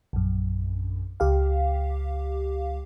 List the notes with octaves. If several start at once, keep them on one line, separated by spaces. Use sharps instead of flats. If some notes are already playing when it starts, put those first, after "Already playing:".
A#1 F#2
C#2 G4 F5